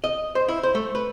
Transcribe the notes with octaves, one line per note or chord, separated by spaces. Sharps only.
D#5
C5
E4
C5
A3
B4